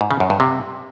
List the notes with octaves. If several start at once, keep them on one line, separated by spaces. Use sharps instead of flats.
G#2
C#3
F#2
G2
C3